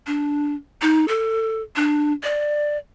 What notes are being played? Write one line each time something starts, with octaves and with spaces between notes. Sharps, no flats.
D4
D#4
A4
D4
D5